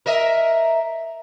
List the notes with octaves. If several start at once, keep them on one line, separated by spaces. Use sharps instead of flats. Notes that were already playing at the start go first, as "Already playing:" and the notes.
A#4 D#5 E5